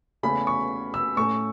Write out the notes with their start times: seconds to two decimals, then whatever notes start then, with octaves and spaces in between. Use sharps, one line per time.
0.23 E2 C#3 A3 C#4 B5
0.47 C#6
0.94 E6
1.17 A2 A3 C#4 C#6